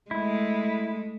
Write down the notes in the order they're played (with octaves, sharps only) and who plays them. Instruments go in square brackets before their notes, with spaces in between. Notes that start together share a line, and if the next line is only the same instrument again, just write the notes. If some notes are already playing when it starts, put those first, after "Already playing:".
[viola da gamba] G#3 A3 [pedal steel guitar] E4